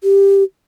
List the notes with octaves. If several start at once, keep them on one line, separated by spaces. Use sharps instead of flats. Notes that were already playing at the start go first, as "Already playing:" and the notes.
G4